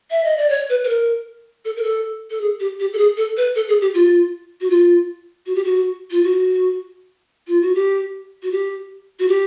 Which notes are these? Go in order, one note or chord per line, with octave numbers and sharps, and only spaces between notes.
E5
D#5
D5
C#5
B4
B4
A#4
A4
A#4
A4
A4
G#4
G4
G4
A4
G#4
A4
B4
A4
G#4
G4
F4
F#4
F4
F#4
G4
F#4
F4
F#4
F4
F#4
G4
F#4
G4
F#4
G4